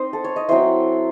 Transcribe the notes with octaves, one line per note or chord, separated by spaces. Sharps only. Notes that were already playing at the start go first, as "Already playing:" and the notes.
Already playing: C4 D#4 C5 D#5
A4
C#5
D#5
F#3 C4 E4 C5